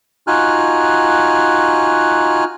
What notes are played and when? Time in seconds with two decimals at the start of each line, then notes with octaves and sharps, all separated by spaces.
0.27 D#4 F4 F#4 G#5 F6 F#6